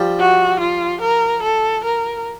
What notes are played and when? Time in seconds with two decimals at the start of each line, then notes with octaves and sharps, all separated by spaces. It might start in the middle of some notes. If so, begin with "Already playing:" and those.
Already playing: F3 G3
0.19 F#4
0.60 F4
1.01 A#4
1.43 A4
1.84 A#4